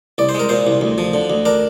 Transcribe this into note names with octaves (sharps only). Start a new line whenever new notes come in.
C2 D5
C5
G#3 A#4
A#2 C5
C2
D2
F3
D3
D2
D4 A#4